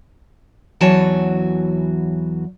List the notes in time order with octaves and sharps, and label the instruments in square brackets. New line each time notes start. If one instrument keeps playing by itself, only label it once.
[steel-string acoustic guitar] E2 E3 F#3 F#4 C#5 A5